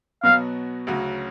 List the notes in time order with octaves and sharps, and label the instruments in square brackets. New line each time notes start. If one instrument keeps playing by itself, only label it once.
[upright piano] B2 F#3 B3 F#4 [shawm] F5
[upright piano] D2 C#3 F#3 C#4 F#4